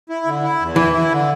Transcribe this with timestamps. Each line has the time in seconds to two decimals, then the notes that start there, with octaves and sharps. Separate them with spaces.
0.09 E4
0.26 D3
0.43 E4
0.60 E2
0.76 E3 E4
0.93 E4
1.11 D3